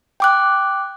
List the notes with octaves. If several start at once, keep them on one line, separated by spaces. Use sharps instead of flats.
G5 D6 F#6